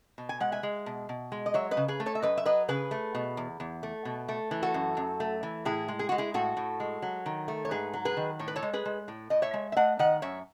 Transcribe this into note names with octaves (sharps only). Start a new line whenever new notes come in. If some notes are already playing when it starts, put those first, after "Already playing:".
B2
G#5
G#3 F#5
E5 G#5
G#3
B2
B2
G#3
D#5
F#3 C#5 E5
B4 D#5
C#3
G#4 B4
A3
A4 C#5
E5
F#2 B4 D#5
E5
F#3 B4 D#5
C#3 G#4 B4
A3
B2
E2
E2
A3
B2
A3
E3
F#4 A4
F#2
F#2
A3
E3
A2 E4 G#4
G#3
G#4
G#3 F#4
E4 G#4
A2 F#4 A4
A2
G#3
F#3
D#3
A3
C#5
G#2 G#4 B4
F#3
G#4 B4
D#3
A2 C#5
B4
A4 C#5
G#3
G#4 B4
G#3
A2
A2 D#5
C#5 E5
G#3
E5
A3 D#5 F#5
D#3 D#5 F#5
F#2 C#5 E5